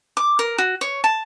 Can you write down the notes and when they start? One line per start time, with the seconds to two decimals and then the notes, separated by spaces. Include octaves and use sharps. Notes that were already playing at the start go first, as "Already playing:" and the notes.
0.17 D6
0.39 A#4
0.58 F#4
0.81 C#5
1.04 A5